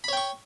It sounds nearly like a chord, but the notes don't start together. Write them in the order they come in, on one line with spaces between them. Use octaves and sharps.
B5 C#5 G5 C#6